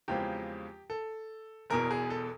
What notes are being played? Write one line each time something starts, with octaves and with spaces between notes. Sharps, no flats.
E2 C#3 F3 G#3 C4 G4
A4
E1 E2 B2 A#4
G#4
A4